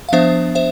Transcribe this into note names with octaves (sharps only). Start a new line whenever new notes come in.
F5
F3 B3 D4 C5 E5
C5 E5